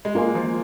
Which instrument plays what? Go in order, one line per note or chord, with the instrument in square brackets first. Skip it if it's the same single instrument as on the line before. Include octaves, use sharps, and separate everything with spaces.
[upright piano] G#3
[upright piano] A#3 [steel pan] F4 A#4 D#5 G#5 C6
[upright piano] F3